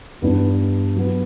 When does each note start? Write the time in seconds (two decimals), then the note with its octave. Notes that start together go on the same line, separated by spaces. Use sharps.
0.22 G2 E3 B3 D4
0.96 F#3 B3 F#4 B4